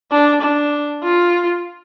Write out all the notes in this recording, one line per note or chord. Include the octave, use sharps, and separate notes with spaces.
D4
D4
F4